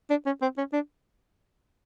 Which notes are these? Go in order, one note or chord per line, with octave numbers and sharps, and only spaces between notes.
D4
C#4
C4
C#4
D4